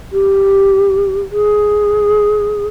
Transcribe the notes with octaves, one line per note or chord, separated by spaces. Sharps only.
G4
G#4